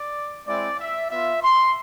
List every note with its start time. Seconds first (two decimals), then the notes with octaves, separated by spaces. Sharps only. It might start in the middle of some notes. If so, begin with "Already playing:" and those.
Already playing: D5
0.47 G#3 C4 E4 D5
0.79 E5
1.10 B3 F4 E5
1.42 C6